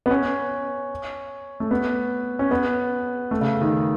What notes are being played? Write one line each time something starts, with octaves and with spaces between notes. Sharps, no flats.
B3
C#4
A3
B3
C#4
B3
A3
C#3
D#3